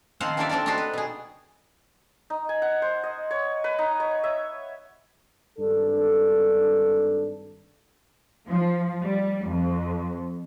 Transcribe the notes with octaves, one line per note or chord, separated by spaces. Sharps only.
D#3 F3 C4 C5 F5 F#5
E3 A#3 D4 G4 D5 E5
C4 D4 A4 A#4 D5
D4 D#4 F#4 G4 A4 C5
B4
B2 G#4
D#4
G#5
F#5
C5
D#5
C#5
B4
D#4
C#5
E5
G#1 G2 D4 A4
F3
G3
F2